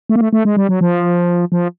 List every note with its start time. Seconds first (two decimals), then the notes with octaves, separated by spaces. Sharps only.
0.09 A3
0.16 A#3
0.21 A3
0.33 A3
0.45 G#3
0.57 G3
0.69 F#3
0.81 F3
1.52 F3